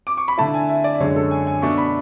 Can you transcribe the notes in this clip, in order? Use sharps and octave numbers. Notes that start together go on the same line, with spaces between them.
D6
C#6
B5
D3 A3 E4 A5
G#5
E5
D5
F#2 D3 G#3 C#5
A4
G#5
G#5
B2 A3 D4 C#6
B5